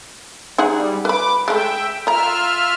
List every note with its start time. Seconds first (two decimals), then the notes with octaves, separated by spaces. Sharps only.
0.58 G3 D#4 G#4 F#5
1.05 B4 B5 D6
1.48 G#3 A3 E5 G5
2.07 F4 D#5 E5 A#5 F6